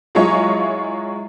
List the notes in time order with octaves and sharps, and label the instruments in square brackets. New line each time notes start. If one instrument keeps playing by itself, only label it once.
[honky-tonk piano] F#3 G#3 E4 F4 C#5 D#5